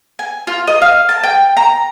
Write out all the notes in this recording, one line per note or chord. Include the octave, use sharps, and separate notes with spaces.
G#5
F4
D#5
F5
A5
G5
A#5